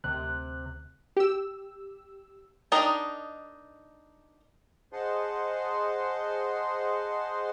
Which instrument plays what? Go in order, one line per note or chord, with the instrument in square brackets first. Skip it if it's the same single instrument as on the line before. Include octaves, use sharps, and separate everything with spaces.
[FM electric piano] D2 F#6 [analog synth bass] C3
[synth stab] G4 E6
[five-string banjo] D4 D#4 A#4 D#5 G5
[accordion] G#4 C5 D#5 F#5 A5 C6